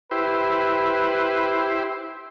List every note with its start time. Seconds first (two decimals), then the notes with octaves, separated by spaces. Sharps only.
0.11 E4 G4 B4 C5